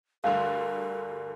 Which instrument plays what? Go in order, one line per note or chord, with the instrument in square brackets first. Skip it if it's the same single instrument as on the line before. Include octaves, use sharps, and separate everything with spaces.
[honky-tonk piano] D2 G2 D3 [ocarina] A#4 [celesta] F5 C6